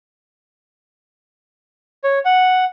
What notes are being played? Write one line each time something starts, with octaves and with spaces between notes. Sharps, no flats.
C#5
F#5